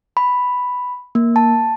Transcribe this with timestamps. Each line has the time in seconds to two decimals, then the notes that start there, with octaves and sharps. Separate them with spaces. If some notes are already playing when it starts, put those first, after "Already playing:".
0.17 B5
1.15 A#3
1.36 A5